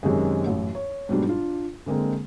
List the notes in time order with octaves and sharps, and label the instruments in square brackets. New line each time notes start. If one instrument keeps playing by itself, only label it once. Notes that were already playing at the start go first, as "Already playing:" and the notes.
[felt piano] F#2 C3 D#3 G#3
A1 F#2
C#5
G#2 B2 F#3 G3 D4
D4 F4
D3 G#3 A#3 C4